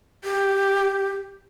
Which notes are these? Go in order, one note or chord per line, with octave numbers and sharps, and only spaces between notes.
G4